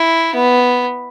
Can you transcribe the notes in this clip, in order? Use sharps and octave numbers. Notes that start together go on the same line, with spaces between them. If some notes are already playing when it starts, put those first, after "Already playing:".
Already playing: E4
B3